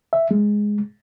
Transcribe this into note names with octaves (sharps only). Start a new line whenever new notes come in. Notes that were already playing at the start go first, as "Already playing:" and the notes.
E5
G#3